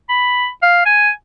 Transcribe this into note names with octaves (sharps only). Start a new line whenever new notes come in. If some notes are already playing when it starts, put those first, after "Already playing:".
B5
F5
G#5